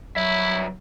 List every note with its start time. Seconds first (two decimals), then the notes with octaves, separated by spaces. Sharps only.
0.16 G2 F#3 E4 E5 B5